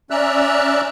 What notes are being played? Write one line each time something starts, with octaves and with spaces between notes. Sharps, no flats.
C#4 D5 E5 A#5 E6 F#6